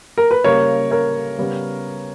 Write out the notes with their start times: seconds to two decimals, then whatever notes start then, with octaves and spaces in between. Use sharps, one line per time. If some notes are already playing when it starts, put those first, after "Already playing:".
0.18 A#4
0.31 B4
0.44 C#3 G3 A#3 A#4 C#5
0.91 A#4 C#5
1.39 C#3 G3 B3